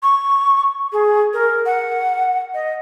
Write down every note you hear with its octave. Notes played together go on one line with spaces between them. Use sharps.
C#6
G#4
A#4
F#5
D#5